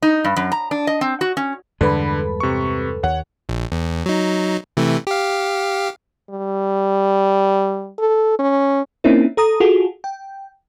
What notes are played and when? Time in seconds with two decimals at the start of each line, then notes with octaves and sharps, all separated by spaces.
0.02 D#4
0.25 G2
0.36 F#2
0.52 A#5
0.71 D4
0.87 D#5
1.01 C4
1.21 F#4
1.37 C#4
1.81 E2 G2 D3 G#3 A4 B4 B5
2.40 C3 C#6
3.03 D#2 C#5 F#5
3.49 A#1
3.72 E2
4.06 F#3 D#4
4.77 C3 E3 A3
5.07 G4 F5
6.30 G3
7.99 A4
8.39 C#4
9.04 A#3 C4 C#4 D#4 E4 A#4
9.37 A4 A#5 D#6
9.60 F4 F#4 G#4 A4
10.04 G5